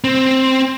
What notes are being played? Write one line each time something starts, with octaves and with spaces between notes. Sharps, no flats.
C4